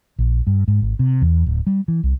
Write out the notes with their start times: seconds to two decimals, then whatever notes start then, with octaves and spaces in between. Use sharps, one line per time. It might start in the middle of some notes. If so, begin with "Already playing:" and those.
0.19 A#1
0.47 G2
0.68 G#2
0.82 G#1
0.99 C3
1.22 E2
1.46 D1
1.67 G3
1.88 E3
2.03 C2